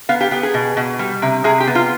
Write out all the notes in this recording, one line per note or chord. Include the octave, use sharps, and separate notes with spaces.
B3 F5
G4
B3 G4
G#4
B2
B2
G3
C3
C3 G#4
G4
B3
F4